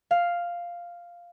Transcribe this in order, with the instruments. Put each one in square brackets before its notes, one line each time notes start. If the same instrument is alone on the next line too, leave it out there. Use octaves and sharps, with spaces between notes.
[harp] F5